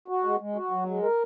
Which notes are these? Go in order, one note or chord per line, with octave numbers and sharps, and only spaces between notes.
F#4
G#3
G#3
F#4
F#3
G#3
A#4